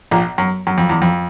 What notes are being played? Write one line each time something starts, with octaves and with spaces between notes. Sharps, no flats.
A#1 A#2
F#2
F#2
F2
E2
F2